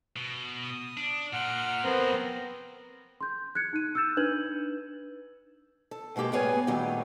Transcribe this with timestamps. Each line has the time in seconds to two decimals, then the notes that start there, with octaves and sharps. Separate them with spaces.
0.16 B2
0.63 D#6
0.97 D4
1.33 A#2 F#5 F6
1.84 F#3 B3 C4 G#4 A#4
3.21 C6 G6
3.55 F#6 G#6 C#7
3.73 D#4 D#7
3.95 E6 F6 G6 A6 E7
4.17 D4 D#4 B4 G6 G#6 F#7
5.91 A4
6.16 B2 G#3 A#3 G4 A4
6.32 A2 G3 B3 G#4 C#5 G#5
6.67 F#2 A#2 D#3 F#3 G3 A3